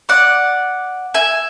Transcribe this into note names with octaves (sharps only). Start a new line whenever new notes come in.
D5 F#5
E5 G#5